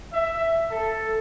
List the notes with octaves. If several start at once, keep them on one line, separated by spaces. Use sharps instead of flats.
E5
A4